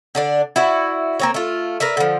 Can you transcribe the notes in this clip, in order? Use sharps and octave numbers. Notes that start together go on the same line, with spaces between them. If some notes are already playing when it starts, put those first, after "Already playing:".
D3 D4 D5
E4 F#4 D5 E5
A#3 C4 C#5
A3 F4
A#4 B4 D5 E5
D3 F3